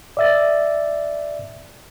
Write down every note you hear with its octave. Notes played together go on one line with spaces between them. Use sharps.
D5 E5 A6